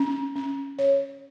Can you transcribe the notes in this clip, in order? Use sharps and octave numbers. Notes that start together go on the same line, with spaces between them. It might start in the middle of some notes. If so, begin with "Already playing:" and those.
Already playing: C#4
C#4
C#5